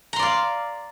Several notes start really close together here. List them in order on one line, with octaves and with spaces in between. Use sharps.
A#5 C6 D5 F5